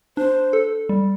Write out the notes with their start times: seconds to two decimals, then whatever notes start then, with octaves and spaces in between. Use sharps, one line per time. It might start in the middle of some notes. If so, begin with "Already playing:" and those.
0.17 D4 C5
0.53 A4
0.89 G3